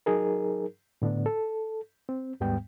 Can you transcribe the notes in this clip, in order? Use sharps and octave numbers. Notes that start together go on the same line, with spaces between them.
F#3 D#4 G#4 A#4
A2 D3 B3 D4
A4
C4
D#2 G#2 G3 B3 G5